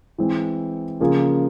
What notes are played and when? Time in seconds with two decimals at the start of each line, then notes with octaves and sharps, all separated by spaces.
0.18 E3 G#3 C4
1.00 C#3 F3 A#3 F4 G#4